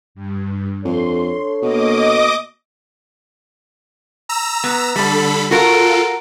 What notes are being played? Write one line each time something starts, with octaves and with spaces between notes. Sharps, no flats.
G2
F2 D4 A4 C#5 C6
B2 A#3 D#5 D6 D#6
A#5 E6
B3
D3 G3 A4 B5
F4 F#4 A4 A#4